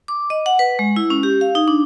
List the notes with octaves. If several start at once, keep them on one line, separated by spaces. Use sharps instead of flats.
D6
D#5
F#5
B4
G#3
E4
C#4
G4
F5
D#4
D4